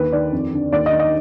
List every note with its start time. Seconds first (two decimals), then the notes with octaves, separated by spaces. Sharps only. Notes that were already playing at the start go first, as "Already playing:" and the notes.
Already playing: D#2 D3 B4
0.12 D#3 D5
0.32 F2
0.53 D3
0.72 D#2 D5
0.86 D#5
0.92 D#3
0.99 D#5